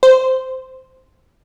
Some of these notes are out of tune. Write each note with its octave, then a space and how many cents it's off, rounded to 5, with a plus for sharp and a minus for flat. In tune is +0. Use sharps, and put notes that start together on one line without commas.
C5 -10